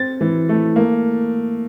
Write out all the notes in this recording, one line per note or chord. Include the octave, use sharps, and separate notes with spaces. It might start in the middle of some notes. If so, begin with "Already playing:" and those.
Already playing: C4 A6
E3
A3
A#3